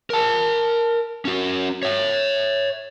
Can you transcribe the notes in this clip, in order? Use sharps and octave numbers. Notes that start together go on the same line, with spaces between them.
A#4 A5
C#4 F#4
C#5 E5